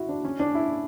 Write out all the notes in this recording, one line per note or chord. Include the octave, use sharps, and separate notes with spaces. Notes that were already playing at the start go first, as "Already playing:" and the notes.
Already playing: E4 F#4
D4
C#4
D4
E4